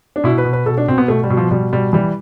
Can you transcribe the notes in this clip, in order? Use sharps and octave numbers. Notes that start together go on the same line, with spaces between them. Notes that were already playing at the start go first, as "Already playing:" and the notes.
D4
B2 E4
B4
B2
B4
B2 A4
D4
B2 C4
B3
B2 A3
G3
B2
F3
B2 G3
B2 G3
E3 G3